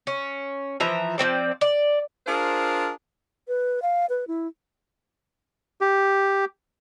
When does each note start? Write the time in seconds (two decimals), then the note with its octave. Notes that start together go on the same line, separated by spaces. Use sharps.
0.07 C#4
0.80 E3 F3 E5 A#5
1.18 F3 A#3 C4 D5
1.61 D5
2.27 D4 F4 G#4 A#4 C5
3.48 B4
3.82 F5
4.09 B4
4.28 E4
5.81 G4